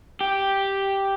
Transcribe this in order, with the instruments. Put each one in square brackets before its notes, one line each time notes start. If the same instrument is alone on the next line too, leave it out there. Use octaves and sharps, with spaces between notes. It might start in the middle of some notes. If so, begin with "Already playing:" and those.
[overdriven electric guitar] G4